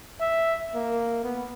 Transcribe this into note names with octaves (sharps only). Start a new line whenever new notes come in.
E5
A#3
B3